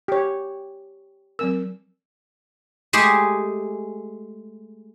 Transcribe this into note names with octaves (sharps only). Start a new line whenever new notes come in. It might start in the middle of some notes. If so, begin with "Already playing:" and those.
G4 C#5
F#3 C4 A#4 E6
G#3 A3 G4 G#4